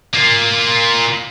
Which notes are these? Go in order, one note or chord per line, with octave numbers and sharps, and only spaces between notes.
A#3 F4